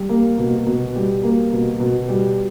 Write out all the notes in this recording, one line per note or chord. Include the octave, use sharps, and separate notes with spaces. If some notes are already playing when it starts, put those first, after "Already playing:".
Already playing: G3
A#3
B2
B2
G3
A#3
B2
B2
G3